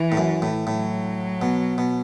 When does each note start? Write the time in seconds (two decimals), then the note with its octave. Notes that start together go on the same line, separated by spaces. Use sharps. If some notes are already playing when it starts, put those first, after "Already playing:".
Already playing: E3
0.12 A2
0.17 F#2
0.42 A2
0.67 A2 F#3
1.42 B2
1.78 B2